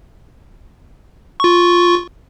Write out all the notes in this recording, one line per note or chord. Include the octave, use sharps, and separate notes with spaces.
F4 C#6